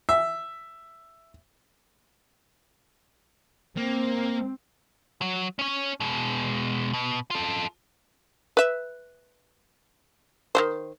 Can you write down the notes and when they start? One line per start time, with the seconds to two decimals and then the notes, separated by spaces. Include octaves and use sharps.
0.09 E5
3.77 A#3 C4
5.21 F#3
5.59 C#4 C#5
6.00 B2 G#3
6.93 B2
7.31 F4 A4
8.57 B4 E5
10.55 D#3 G#3 C5